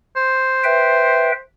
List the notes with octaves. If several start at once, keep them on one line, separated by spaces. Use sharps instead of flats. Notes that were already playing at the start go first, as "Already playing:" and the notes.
C5
B4 E5 G5